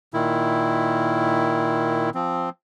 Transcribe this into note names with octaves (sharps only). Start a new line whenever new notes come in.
A#2 D#3 E4
F3 C4